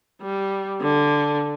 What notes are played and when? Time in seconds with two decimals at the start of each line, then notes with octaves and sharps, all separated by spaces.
0.21 G3
0.81 D3